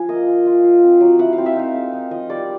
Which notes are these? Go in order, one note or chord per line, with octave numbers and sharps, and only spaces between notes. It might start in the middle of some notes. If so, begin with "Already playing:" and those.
Already playing: F3 F4 G#5
A#3 D#5
F4
F4
F4
C4
F#3
E4 F#5
F5
C4
E5
D#4 F5
G#3
D#4
F3 D#5
G3 D5